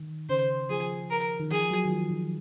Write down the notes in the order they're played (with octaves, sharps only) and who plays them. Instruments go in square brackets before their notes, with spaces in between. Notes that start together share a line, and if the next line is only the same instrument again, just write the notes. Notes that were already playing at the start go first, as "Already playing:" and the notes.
Already playing: [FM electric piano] D#3
[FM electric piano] C#3 [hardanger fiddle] C5
[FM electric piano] F3 [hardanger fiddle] G#4
[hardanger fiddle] A#4
[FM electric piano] D#3
[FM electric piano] F3 [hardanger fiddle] G#4
[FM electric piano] F#3
D#3
F3
D#3